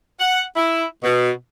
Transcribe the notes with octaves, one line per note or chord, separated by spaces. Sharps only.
F#5
E4
B2